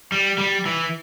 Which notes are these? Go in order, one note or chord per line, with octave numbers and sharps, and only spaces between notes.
G3
G3
E3